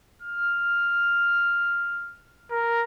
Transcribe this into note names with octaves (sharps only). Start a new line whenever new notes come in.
F6
A#4